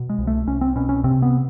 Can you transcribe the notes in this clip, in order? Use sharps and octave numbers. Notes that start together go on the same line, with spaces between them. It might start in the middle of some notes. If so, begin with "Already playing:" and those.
Already playing: B2
G#3
C2
A3
C2 C#4
C4
B2 C#4
C#4
C3 C4
B3